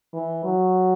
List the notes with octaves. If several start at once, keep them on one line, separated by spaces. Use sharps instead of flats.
E3
F#3